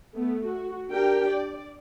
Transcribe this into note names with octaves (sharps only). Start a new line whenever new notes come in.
A3 B3
F#4
D4 G4 A#4 G5
D5